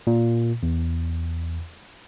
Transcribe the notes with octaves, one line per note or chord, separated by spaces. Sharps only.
A#2
E2